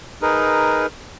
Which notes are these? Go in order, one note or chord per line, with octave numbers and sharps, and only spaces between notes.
D#4 G#4 A#4 B4